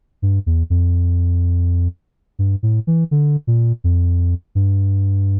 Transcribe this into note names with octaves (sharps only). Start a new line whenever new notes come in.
G2
E2
F2
G2
A2
E3
D3
A#2
F2
G2